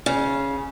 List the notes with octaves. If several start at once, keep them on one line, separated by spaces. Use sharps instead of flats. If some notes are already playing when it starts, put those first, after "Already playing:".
C#3